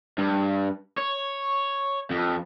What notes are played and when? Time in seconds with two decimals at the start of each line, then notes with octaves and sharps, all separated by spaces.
0.18 G2
0.98 C#5
2.11 F2